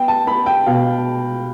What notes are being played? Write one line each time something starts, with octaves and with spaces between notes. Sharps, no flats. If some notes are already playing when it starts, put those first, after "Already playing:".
Already playing: B3 G5
A5
B3 B5
G5
B2 F5